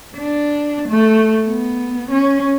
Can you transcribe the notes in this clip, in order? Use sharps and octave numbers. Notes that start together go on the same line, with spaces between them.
D4
A3
B3
C#4